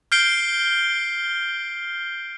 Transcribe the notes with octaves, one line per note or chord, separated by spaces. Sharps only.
F6 G6 C7 D7 G7